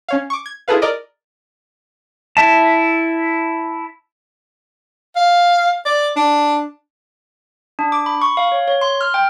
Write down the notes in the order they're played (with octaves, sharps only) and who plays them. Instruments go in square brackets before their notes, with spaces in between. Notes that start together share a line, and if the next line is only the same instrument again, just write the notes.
[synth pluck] C#4 C#5 F5
C#6 D6
G#6
E4 F4 G#4 A4 B4 F5
A#4 D5 D#5
[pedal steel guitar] E4 E5 A5
[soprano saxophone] F5
D5
D4
[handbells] D4
D6
B5
C#6
F5
C#5
C#5
C6
F6
G5